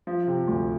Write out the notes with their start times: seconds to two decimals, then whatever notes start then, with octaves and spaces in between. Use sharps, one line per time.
0.07 F3
0.27 C3
0.47 D2